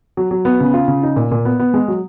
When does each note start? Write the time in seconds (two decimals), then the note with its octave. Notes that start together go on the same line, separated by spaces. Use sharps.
0.17 F#3
0.31 F#3
0.45 B3
0.60 C#3
0.74 F4
0.88 C#3
1.03 D#4
1.16 A#2
1.31 A#2
1.45 B3
1.59 B3
1.74 G#3
1.88 F#3